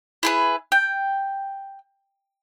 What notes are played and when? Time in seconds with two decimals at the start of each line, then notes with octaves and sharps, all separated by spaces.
0.23 E4 G#4 B4
0.72 G5